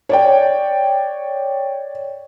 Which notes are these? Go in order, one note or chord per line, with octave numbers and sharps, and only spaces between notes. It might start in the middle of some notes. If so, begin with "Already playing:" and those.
C#5 D5 G5